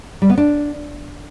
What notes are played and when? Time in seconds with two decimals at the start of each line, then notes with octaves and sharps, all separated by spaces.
0.22 G3
0.30 B3
0.38 D4